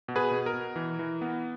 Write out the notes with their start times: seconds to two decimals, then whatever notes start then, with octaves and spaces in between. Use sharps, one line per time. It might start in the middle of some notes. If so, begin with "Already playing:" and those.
0.08 B2
0.16 G#4 B4
0.31 B2
0.46 A#4
0.54 B2
0.76 E3
0.99 E3
1.21 B3